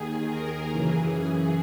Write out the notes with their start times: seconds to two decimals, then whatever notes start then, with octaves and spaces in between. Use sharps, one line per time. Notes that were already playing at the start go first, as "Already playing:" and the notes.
Already playing: D#2 D#3 G#4
0.29 A#4
0.70 F#2 C#3 E3 G#4